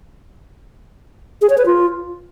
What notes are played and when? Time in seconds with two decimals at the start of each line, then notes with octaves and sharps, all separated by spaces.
1.42 G#4
1.50 C#5
1.58 B4
1.66 F4